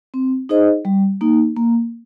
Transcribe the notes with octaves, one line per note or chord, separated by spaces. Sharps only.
C4
D#4 G#4 C5 D#5
G3
A#3 D#4
A#3